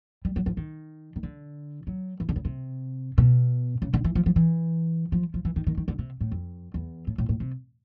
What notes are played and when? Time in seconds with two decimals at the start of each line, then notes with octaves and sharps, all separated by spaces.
0.25 G3
0.36 F#3
0.46 F3
0.57 D#3
1.16 D#3
1.23 D3
1.87 F#3
2.20 E3
2.29 D3
2.36 C#3
2.45 C3
3.18 B2
3.82 C#3
3.94 D3
4.04 E3
4.15 F3
4.26 F3
4.36 E3
5.12 F3
5.34 F3
5.45 E3
5.56 D#3
5.67 D#3
5.77 D#3
5.88 D3
5.99 C3
6.21 A2
6.32 F2
6.74 E2
7.07 A2
7.18 A2
7.29 A2
7.40 C3